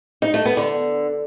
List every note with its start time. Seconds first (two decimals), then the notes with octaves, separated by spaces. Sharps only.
0.22 D#4
0.34 A3
0.45 B3
0.57 D3